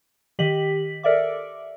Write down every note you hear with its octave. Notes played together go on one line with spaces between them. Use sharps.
D#3 G4 D#5 B6 F#7
A4 A#4 D5 E5 D6